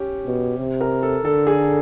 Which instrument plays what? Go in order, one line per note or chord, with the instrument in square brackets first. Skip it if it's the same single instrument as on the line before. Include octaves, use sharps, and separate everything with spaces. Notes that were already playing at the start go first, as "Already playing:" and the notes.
Already playing: [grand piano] C#4 G4
[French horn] B2
C3
[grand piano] A#4
A4
[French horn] D3 [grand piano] A4
[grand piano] G#4